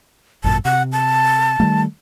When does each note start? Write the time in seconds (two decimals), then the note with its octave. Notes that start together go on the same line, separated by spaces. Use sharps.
0.44 G#1 F#2 A#2 A5
0.65 C3 F#5
0.92 A5
1.60 D#3 G3 A3